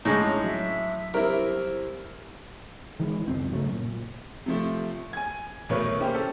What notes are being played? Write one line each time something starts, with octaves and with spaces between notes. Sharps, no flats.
A2 D3 G#3 C#4 D#4 G#4 A#5
F#3 E5
C2 E4 A#4 C5
D#3 E3 G#3
C#2 F#2 C4
G2 C#3 F#3 A3
A#2
C3 F3 A3
G#5 G#6
B1 D#3 F#3 A3 B4 C#5
A#3 C#4 E4 G4 C5
A4